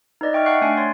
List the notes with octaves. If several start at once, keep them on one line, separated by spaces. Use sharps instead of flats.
D#4 B4 D5 D#5
E5 G5 C#6 F6
E5 F#5 A5 C#6 F#6 C7
A3 D4 D5 G#5 C7 D7
C#5 D5 G#5 C6 A6